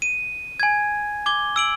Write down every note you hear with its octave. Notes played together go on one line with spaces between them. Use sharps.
D#7
G#5 G#6
D6 G#6 G7
E6 D7 F#7